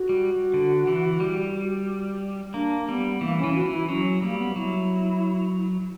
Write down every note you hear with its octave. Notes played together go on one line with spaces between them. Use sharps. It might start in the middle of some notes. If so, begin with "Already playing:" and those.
Already playing: F#4
G3
D3
E3
G3
A#3 D4
G3 B3
E3 A#3
C#4
E3
F#4
E3
E4
F#3 C#4
G3 A#3
B3
F#3 E4